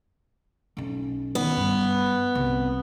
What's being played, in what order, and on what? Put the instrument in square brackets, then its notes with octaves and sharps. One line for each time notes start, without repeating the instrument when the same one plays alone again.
[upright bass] B1 C#4
[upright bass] D#3 [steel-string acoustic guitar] B3
[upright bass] G2
C2